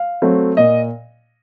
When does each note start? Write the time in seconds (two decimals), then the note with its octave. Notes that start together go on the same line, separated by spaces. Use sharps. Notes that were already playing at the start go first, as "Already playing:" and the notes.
Already playing: F5
0.22 F#3 A3 C4
0.57 A#2 D#5